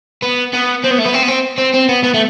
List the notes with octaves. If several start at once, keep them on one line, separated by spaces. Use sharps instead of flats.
B3
B3
C4
B3
A3
B3
C4
B3
C4
C4
C4
B3
B3
A3